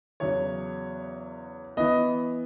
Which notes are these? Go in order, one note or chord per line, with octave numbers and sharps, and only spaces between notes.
E2 C#3 F#3 C#5
E3 B3 D#5